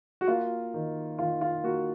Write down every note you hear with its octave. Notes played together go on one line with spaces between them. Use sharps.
F#4
A#3 F4
D#3
D#3 F4
F4
A#3 F#4